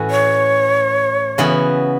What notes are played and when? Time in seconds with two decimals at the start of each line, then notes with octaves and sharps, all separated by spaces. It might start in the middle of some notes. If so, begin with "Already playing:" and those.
Already playing: A2 E3 C#4 F#4
0.11 C#5
1.38 C#3 E3 B3 F#4